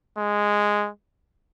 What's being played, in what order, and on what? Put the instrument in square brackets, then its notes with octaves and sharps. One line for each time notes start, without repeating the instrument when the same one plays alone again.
[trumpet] G#3